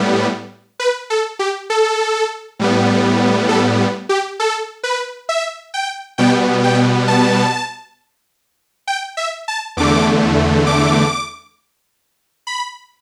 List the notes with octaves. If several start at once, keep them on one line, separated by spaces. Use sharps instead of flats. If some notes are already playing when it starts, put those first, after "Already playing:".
Already playing: A2 G3 B3
B4
A4
G4
A4
A2 G3 B3
A4
G4
A4
B4
E5
G5
B2 G3 B3 G5
G5
A5
G5
E5
A5
E2 D3 A3 D6
D6
B5